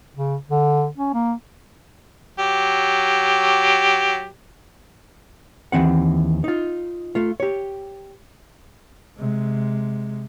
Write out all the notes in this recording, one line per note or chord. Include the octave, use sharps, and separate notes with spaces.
C#3
D3
C#4
A#3
F#3 G4
D#2 G#2 E3 C4 F#5
D#4 F4
A3 F4
G4 C#5
C3 G#3